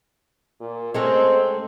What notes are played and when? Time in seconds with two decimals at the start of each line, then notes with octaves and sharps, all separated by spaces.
0.60 A#2
0.94 G#3 A3 C4 C#4